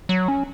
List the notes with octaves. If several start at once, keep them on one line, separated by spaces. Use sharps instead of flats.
F#3
C#4